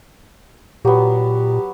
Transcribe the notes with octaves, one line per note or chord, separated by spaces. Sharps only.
A#2 F#3 B3 G4